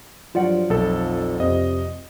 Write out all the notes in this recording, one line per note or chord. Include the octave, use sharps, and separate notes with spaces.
G2 F3 F#3 F4 D5 F#5
B1 F2 A4
F2 C3 D#5